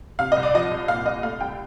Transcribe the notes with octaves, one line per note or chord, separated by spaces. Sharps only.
C3 F5
C2 D#5
D5
F3 D#5
C2
A#2 F5
C2 D#5
A3 F5
C2 G5